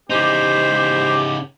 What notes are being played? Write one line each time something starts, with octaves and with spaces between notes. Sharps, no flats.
C#3 E3 B3 D#4 G4 C5